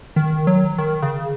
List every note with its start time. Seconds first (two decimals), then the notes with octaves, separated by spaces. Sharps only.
0.16 D#3
0.47 F#3
0.78 D#3
1.02 C#3